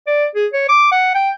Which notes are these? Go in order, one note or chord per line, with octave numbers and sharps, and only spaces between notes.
D5
G#4
C#5
D6
F#5
G5